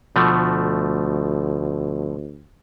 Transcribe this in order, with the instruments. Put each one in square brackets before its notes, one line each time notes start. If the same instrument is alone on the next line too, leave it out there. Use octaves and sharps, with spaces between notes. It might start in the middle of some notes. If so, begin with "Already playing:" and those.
[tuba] D2 [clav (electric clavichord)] B2 F3 A3